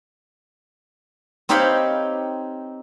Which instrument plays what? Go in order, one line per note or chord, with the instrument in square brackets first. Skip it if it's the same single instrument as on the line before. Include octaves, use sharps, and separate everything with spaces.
[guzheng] C4 D#4 G4 C#5 F5 B5